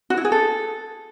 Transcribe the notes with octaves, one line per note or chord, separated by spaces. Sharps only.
F#4
E4
G#4
A4